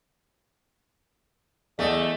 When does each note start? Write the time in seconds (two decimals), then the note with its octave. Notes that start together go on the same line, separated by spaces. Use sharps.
1.79 E2 A3 G#4 D5 D#5